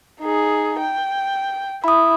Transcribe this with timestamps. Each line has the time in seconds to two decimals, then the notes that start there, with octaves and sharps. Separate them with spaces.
0.21 D#4 G#4
0.80 G5
1.84 E4 B5 D#6